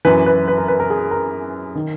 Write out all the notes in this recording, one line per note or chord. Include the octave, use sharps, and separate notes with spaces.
F#2 E3 B4
B4
B4
A#4
B4
A#4
G#4
A#4
D#3